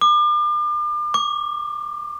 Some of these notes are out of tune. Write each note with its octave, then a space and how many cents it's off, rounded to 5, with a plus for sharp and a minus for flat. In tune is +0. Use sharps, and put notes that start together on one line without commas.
D6 +40
D6 -15